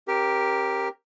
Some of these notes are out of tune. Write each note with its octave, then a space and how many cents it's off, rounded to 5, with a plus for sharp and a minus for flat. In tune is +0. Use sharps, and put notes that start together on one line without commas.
C#4 -40 G4 +0 A#4 +0